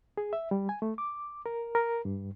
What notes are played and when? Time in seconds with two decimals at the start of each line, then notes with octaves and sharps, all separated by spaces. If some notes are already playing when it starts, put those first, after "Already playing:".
0.17 G#4
0.33 E5
0.51 G3
0.69 G#5
0.82 A3
0.98 D6
1.46 A#4
1.75 A#4
2.05 G2